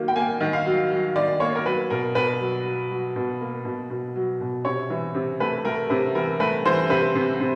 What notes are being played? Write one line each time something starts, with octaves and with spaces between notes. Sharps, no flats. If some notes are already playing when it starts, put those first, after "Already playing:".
Already playing: D#3 F#3 A#3
G5
A#3 G#5
D#3
F5
F#3
F#3
D#3 D5
A#3 C#5
A#4
F#3 B4
B2 A#4
B2 B4
F#3
F#3
F#3
B2
A#3
B2
B2
F#3
B2
C3 C#5
E3
C3
A3 B4
A3 A#4
C3 B4
E3 A#4
A3 B4
E3 C5
C3 B4
C3
C3